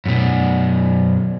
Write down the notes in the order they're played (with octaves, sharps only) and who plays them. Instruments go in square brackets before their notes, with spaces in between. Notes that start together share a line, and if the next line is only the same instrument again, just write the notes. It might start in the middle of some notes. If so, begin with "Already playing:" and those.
[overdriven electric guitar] F#2 B2